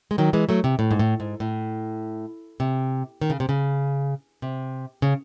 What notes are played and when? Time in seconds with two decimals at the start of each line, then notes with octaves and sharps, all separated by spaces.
0.11 G#3
0.18 D#3 F#3
0.33 E3 G#3
0.49 F#3 A3
0.64 C3
0.79 A2
0.91 G#2
0.99 A2
1.20 G#2
1.40 A2
2.60 C3
3.21 D#3
3.30 C#3
3.40 C3
3.49 C#3
4.42 C3
5.02 C#3